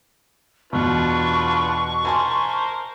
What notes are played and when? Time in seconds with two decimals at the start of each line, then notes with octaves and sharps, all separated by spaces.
0.73 E2 B2 D4 F4 B4 C#6
2.05 A#4 C5 G#5 A5 C6